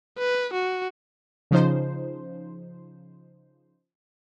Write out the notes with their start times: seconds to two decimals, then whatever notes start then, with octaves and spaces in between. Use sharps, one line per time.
0.18 B4
0.53 F#4
1.51 C#3 F3 D#4 C5